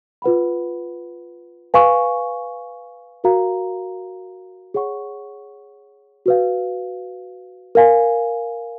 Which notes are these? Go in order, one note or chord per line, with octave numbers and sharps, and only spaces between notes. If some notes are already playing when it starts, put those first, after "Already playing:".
F4 B4 F#5 B5
B4 F5 G#5 C#6
F#4 A#4 F5 A#5
G#4 C#5 F#5 C#6
F#4 B4 F5
A#4 F5 G#5